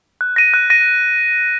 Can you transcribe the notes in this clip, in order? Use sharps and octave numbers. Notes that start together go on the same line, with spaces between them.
F#6
A#6 D#7
F#6
A#6 D#7